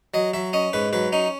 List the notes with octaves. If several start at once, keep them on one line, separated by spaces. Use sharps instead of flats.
F#3 D#5
F#3 E5
C#4 D#5
G#2 B4
F#3 B4
C#4 D#4